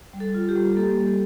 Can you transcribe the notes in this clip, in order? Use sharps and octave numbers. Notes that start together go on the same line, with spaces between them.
G3
A4
F4
G4
G3
A#3 A4
G3